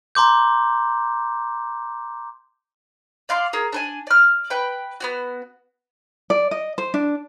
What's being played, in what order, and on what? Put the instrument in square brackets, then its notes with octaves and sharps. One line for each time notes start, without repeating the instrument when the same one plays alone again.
[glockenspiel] A#5 C6 D6 G6
[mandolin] D5 F5 C6 D6
G#4 A#4
D4 A4 G#5
D5 F6
B4 G5
B3 C#4 F#4
[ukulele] D5
D#5
C5
D4